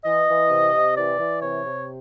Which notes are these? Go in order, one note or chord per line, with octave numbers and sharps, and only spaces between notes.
E3 D#5
E3
C3
C3
E3 D5
E3
C3 C#5
C3